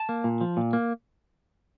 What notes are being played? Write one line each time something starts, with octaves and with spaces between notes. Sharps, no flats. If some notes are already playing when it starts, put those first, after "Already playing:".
Already playing: A5
A#3
A#2
F3
A#2
A#3